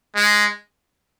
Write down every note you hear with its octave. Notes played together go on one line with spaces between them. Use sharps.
G#3